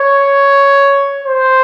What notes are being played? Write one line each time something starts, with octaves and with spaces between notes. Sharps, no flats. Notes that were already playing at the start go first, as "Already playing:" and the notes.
Already playing: C#5
C5